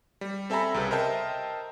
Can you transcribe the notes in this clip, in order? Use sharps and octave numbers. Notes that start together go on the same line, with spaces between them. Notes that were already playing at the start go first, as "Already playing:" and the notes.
G3
C4 A4 E5 G#5 A#5 B5
C2 C#3 G3 B4
A#4 C5 D#5 E5 G5 A5